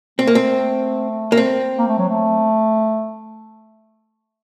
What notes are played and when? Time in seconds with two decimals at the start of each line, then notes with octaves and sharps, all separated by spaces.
0.19 A3 C4
0.27 A#3
0.35 C4
1.32 A#3
1.37 C4
1.78 A#3
1.88 A3
1.98 F#3
2.09 A3